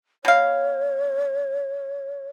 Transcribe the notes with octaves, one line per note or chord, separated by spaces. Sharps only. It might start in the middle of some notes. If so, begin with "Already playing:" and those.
B2 C#5 F5